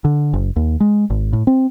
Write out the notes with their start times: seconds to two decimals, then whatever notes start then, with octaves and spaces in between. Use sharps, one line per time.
0.05 D3
0.33 F#1
0.56 D#2
0.80 G#3
1.10 G#1
1.33 A2
1.47 C4